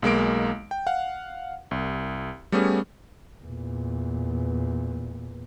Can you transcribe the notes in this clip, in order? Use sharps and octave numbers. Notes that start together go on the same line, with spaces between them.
B1 G#3 A#3 D7
G5
F5 F#5
C2
G3 A3 B3 C#4 G#4
E2 A#2